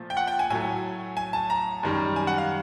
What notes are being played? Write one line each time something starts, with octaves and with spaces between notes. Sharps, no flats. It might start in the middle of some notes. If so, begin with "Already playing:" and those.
Already playing: A#2 F3 A3
G5
F#5
G5
G#5
A2 F#3 A3 G#5
G#5
A5
A#5
F#2 D#3 G3
G#5
F#5
F5